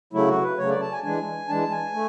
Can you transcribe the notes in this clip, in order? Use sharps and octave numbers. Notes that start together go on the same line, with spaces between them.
C#3 F#3 A3 E4
F#4
B4
C#3 F#3 A3 C#5
D5
A5
G#5
E3 G#3 D4 G#5
E3 G#3 D4 A5
G#5
A3